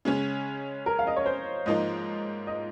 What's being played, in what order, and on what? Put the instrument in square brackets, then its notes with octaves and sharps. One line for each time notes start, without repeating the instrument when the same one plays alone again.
[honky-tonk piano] C#3 G#3 C#4
[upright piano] A#4
F5
D#5
C#5
C5
[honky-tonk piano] G#2 F3 A#3 D#4 [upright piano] D#5
[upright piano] D#5